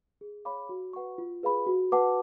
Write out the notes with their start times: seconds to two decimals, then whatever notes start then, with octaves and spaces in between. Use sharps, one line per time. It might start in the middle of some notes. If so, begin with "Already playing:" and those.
0.21 G#4
0.45 C#5 F5 B5 D6
0.69 F#4
0.93 B4 F#5 C#6
1.18 F4
1.43 G#4 B4 F5 B5
1.67 F#4
1.92 B4 F#5 A5 D6